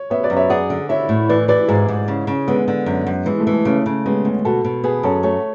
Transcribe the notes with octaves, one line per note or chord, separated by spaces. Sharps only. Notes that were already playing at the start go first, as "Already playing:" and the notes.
Already playing: C#5
B3 C#5 E5
B4 D5
F#2
C#5 E5
G#4 D5 F#5
D3
E4 C#5 E5
A2
E3 B4 D5
E3 B4 D5
G#2 E4 G#4
G#2
C#3
C#3
D3 G#3 B3
D3
F#2
F#2
E3 G#3
A3
E3
A3
C#3 A3
C#3
G#3 B3 C#4
D2
B2 F#4 A4
B2
B3 G#4 B4
F#2 A4 C#5
A3 A4 C#5